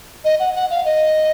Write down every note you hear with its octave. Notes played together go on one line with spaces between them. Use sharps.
D#5
F#5
F#5
F5
D#5